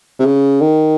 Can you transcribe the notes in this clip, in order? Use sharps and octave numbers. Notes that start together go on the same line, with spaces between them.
C3
C#3
D#3